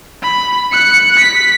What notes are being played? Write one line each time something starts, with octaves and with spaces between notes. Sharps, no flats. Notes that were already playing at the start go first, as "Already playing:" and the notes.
B5
F#6 C#7
B6